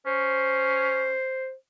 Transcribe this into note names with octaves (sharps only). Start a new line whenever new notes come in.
C#4 C5